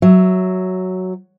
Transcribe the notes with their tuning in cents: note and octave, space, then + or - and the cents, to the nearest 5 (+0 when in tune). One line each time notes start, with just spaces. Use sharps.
F#3 +0 E5 -5